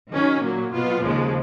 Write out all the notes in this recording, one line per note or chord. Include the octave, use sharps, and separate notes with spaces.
D#3 F#3 C#4
A#2 F#3 A#3
B2 F#3 B3 F4
D#2 C#3 F3 G#3